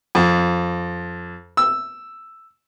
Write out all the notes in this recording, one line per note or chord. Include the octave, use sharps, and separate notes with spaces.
F2
E6